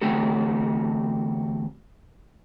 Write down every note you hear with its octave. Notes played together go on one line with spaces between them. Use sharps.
E2 D3 A3 C4 F#4 A4